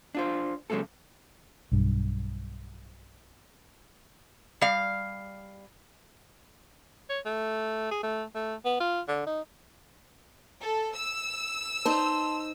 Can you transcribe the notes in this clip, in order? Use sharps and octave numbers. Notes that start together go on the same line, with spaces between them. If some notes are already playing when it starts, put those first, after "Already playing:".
D4 F4 C5
F#2 C#3 F#3 G#3 A#3 A4
B1 G2
G3 F5
C#5
A3
G#4
A3
A3
B3
F4
D3
D#4
A4
E6
D#4 C5 A5 C6